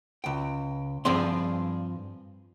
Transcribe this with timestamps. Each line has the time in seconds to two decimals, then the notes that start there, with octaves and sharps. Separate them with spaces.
0.24 C#2 G5
1.05 G2 F3 C4 G#4 D5 C6